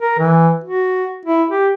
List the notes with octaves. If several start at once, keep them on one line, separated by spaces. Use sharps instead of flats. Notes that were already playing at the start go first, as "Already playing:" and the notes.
A#4
E3
F#4
E4
G4